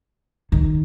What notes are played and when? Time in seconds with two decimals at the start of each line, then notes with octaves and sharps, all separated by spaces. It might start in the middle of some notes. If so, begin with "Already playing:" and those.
0.52 D#3